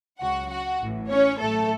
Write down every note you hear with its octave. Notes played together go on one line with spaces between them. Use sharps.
C#2 C#3 F#3 F#4 F#5
F#4 F#5
A1 A2 E3
C#4 C#5
A1 A2 F#3 A3 A4